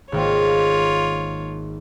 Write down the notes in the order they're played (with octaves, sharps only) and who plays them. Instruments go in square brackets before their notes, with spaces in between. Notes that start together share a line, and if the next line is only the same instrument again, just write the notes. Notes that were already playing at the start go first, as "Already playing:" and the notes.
[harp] G#1 A#3 [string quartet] F4 C#5